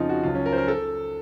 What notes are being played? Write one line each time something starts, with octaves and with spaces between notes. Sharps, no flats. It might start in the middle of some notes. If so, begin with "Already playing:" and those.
Already playing: F2 C#3 F3 D#4 F4
F#4
C#2 C#3 F#3 F4
C#4
A#4
C5
A#4
A4